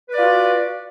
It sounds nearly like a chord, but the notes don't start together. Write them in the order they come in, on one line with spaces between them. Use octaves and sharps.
B4 D5 F4 F#4